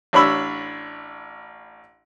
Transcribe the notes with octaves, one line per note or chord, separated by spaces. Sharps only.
A1 D4 C#5 B5 E6